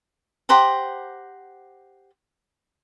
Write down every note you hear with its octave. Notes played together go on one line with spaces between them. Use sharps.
G4 C5 F#5 A#5